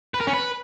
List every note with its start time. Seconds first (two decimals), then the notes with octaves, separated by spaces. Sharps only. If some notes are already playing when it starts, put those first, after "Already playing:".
0.14 B4
0.21 A#4
0.27 C#4
0.34 B4